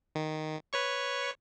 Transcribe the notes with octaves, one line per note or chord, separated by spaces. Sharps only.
D#3
B4 C#5 C#6